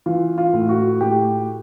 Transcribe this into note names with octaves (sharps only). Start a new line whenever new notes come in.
E3 F4
F4
A2
F#4
A2 G4